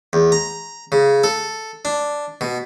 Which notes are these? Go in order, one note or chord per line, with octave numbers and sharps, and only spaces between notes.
E2
A#5
C#3
A4
D4
B2